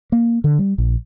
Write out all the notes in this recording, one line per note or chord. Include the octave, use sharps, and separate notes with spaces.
A#3
D3
G3
A#1